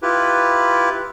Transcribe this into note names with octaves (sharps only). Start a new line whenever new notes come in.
E4 F4 G4 B4